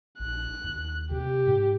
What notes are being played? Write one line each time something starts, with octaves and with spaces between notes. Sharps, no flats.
A#1 F#6
D#2
C3 G4
G#2